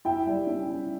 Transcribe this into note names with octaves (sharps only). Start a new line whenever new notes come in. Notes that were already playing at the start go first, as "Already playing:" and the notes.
E4 E5 G5
G3
C#4
E4